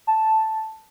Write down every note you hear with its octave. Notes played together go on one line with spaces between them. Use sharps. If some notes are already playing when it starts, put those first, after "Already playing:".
A5